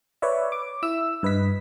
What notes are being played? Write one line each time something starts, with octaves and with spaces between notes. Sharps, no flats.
B4 C#5 D5 E5
D6
E4 E5 E6
G2 B4 D#5 B6